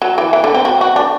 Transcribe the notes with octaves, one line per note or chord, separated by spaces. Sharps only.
F#3
E3
E3
D3
C4
F#4
F#4
D4